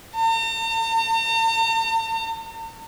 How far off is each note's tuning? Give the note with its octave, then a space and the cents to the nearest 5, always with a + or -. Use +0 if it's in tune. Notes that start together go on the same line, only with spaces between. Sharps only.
A#5 -45